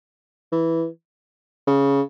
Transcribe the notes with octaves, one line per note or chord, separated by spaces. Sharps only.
E3
C#3